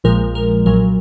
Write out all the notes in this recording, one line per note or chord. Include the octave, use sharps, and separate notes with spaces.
A#1 A#2 F3 G#3 A#4
A#4
B1 A#2 F#3 A#4